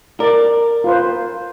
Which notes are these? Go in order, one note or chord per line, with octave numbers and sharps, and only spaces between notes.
A#4 D5
F4 B4 C5